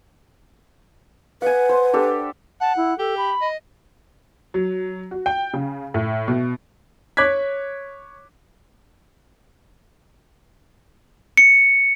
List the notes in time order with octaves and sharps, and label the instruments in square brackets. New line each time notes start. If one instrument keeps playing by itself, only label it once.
[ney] B4 [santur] F#5 G#5
[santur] C5
D4 G4 A4
[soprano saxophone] F#5 [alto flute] A5
[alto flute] E4
[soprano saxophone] G4 [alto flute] A4
[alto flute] B5
[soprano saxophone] D#5
[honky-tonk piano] F#3
F#4
G5
C#3
A2
B2
[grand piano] C#5 D6 F#6 G#6 B6
[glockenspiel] C#7